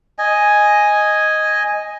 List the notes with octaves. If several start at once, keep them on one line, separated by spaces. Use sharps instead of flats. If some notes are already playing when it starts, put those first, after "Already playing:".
D#5 G#5